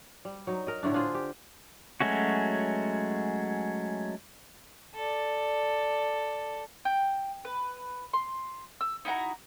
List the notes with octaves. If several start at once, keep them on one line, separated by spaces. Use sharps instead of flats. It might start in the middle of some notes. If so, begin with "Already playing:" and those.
G3
F#3 D#4
A#4 D#5
A2 D3 A3 D4
D4 F4 G#4 C5
G4
F#3 G#3 A3 C#4 F#4
A4 D5
G5
B4
C6
E6
D#4 E4 F#4 A#5